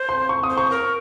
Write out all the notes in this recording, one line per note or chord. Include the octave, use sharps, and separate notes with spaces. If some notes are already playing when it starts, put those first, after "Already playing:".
Already playing: C5
C6
C#6
D#6
C5
C#6
A#4